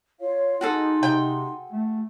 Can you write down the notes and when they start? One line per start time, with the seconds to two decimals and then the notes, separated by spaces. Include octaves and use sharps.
0.20 F4 C#5 F5
0.61 D#4 F#4 G#4 A4 C6
1.03 C3 G5
1.72 A3